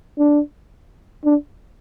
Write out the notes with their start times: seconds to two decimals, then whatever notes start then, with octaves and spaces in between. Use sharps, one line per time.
0.18 D4
1.24 D4